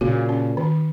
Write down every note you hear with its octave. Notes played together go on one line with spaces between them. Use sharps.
A#2 C#3 F#4
C#4
D#3